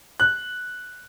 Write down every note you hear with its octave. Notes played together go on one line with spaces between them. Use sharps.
F#6